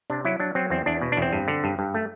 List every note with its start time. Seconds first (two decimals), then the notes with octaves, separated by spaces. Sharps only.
0.10 C3 D4
0.25 F#3 E4
0.40 F#3 D4
0.55 F#3 C4
0.70 E2 C4
0.86 E2 D4
1.02 B2
1.12 D4
1.17 E2 C4
1.33 G2
1.48 D3
1.64 G2
1.79 G2
1.94 A3